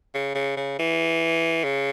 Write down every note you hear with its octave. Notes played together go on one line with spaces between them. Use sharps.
C#3
C#3
C#3
E3
C#3